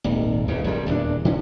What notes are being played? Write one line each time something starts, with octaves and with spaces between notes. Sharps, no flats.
D#1 G#1 D#2
B1 E2 G2 C#3
F#1 F2 B2 G3
D#1 E2 E3 D4
D3 C#4